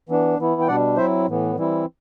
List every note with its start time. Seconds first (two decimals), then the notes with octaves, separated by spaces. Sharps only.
0.09 E3 B3 D4
0.39 E3 B3 E4
0.61 G5
0.67 B2 G3 D4 D5 F#5
0.97 F#3 C4 E4 C5 E5
1.27 A2 E3 B3
1.56 E3 G3 C4 E4